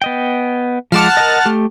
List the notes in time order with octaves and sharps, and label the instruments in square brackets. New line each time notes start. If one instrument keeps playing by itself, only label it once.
[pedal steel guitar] B3 D#5 G5
[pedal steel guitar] F3 G#3 D6 [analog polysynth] F#5 A5 F6
[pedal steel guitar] A#4 D#5
A3 G4